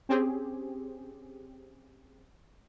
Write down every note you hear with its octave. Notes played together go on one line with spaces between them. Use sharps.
C4 C#4 G4 G#4